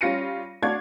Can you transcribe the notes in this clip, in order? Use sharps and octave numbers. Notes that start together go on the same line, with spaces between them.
G3 C#4 F4 A#6 C#7 D#7
D4 F#4 F5 C#6 G#6